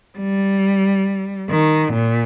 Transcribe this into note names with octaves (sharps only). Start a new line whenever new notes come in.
G3
D#3
A#2